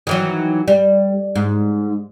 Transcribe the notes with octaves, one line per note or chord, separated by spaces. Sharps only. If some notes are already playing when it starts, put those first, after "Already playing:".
D#3 E3 F#3
G3
G#2